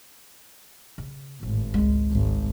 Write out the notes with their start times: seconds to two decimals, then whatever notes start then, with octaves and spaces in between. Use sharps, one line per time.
0.98 C#3
1.43 G#1 A2
1.74 C#2 G#3
2.12 G#1